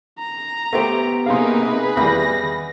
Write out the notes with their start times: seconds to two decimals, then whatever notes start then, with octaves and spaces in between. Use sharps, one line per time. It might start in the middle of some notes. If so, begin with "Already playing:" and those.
0.19 A#5
0.73 A3 B3 G4 C5
1.26 C3 A#3 D#4 G#4 B4 F5 C6
1.97 E2 D#3 G3 B5 A#6